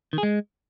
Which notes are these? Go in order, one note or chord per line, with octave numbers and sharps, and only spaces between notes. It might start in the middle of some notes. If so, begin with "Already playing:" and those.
D#3
G#4
G#3